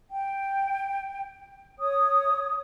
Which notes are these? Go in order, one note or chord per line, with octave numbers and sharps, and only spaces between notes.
G5
C#5 D#6